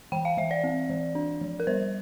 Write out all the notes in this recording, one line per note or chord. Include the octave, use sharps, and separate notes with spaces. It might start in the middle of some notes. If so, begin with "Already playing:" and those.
E3 G5
F5
E3 E5
D5
C4
E3
D4
F3
A#4
G3 C5